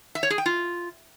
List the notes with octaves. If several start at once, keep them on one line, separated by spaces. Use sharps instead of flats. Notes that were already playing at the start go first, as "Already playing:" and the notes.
E5
C#5
G#4
G5
F4